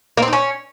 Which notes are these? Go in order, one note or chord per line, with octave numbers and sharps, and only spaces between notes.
A#3
C4
D#4
C#4